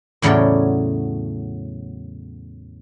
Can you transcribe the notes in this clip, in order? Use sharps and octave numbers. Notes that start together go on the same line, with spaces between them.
E2 A2 C#3 F#3 C#5 D5